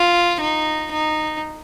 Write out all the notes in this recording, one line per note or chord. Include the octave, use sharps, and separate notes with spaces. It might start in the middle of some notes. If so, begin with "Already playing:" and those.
Already playing: F4
D#4
D#4